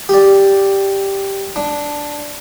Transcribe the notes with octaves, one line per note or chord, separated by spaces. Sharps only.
G4 D5
D4